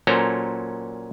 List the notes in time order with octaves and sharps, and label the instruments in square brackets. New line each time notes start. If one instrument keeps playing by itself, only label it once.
[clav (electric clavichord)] A#2 F#3 C#4 A4 C5 A#5